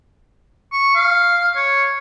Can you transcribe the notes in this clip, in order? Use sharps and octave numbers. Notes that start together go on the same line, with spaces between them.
C#6
F5
C#5